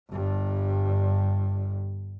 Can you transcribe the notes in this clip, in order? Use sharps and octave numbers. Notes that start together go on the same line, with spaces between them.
G1 G2